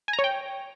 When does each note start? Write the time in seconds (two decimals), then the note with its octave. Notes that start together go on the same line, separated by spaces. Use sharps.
0.08 G#5
0.13 A#5
0.19 C#5
0.24 G5